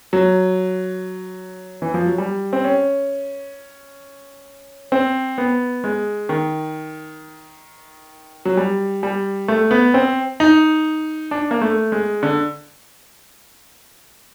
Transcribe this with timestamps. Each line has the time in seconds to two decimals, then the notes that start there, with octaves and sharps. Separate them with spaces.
0.13 F#3
1.82 E3
1.94 F3
2.06 F#3
2.18 G3
2.53 C4
2.64 C#4
4.92 C4
5.38 B3
5.84 G#3
6.29 D#3
8.45 F#3
8.57 G3
9.03 G3
9.48 A3
9.71 B3
9.94 C4
10.40 D#4
11.31 D4
11.51 A#3
11.61 A3
11.92 G#3
12.23 D3